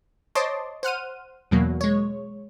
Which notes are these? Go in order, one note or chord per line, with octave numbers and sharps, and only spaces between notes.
C5 C#5 D#5 A5 C6 D6
C5 F#5 F6 D#7
E2 B2 F#3 A#3
G#3 C#5